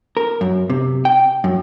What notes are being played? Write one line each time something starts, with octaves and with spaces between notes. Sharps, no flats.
A#4
F#2
C3
G5
F#2